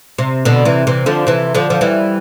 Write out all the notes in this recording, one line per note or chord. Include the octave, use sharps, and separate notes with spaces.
C3
B2 D3
C3 E3
C3 E3
D3 F3
C3 E3
D3 F3
F3
E3 G3